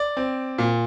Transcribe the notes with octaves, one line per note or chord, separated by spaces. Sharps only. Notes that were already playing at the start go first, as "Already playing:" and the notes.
Already playing: D5
C4
A#2